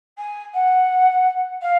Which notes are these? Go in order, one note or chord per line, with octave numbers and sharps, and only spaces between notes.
G#5
F#5
F5